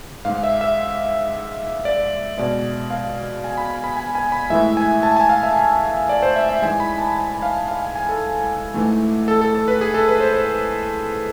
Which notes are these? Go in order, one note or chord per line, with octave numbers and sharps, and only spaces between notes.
G#2 G#3 F5
E5
E5
D5
B2 G#3 D5
F5
G#5
B5
B5
B5
G#5
G#5
B5
A2 E3 G#3 E5
G#5
A5
G#5
F5
E5
D5
C5
E5
E5
G#2 E3 G#3 G#5
B5
A5
G#5
G#5
F5
F5
G#5
G#5
A4
G#2 E3 A3
A4
A4
A4
B4
G#4
A4
B4
C5
C5